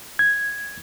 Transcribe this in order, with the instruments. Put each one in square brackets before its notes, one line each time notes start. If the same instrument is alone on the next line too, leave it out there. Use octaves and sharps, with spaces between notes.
[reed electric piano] G#6